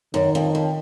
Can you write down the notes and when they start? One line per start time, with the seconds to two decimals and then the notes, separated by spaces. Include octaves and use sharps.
0.14 F#2 D#3
0.35 F2
0.55 F2